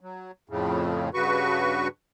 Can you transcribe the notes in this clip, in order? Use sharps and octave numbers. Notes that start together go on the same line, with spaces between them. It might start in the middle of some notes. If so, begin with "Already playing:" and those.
F#3
F2 A2 C#3
G2 C#3 F#4 B4 C#6